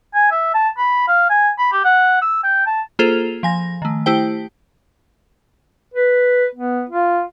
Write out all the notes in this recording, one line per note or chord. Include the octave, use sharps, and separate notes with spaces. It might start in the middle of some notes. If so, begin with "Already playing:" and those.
G#5
E5
A5
B5
F5
G#5
B5
G4
F#5
E6
G5
A5
A#3 F4 G#4 A4 C5 F7
F3 G#5 A#6
D#3 A3
A3 E4 G4 C5 G5
B4
B3
F4